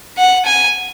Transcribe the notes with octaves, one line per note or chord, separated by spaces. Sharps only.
F#5
G#5